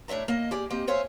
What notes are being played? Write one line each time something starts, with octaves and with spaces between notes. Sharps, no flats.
A2 D4 C#5 E5 A#5
A#3 D#5
G4 G#4 D5
A#3 C4 G4 D#5
C5 C#5 E5 F5 G#5